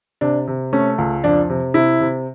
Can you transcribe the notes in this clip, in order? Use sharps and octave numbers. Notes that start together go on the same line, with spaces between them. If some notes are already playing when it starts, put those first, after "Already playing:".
C3 D4
C3
A3 C#4
C#2
F2 D4
C3
C3 E4
C3